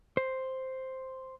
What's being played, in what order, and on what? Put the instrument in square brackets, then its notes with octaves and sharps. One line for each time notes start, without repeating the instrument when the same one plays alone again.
[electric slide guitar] C5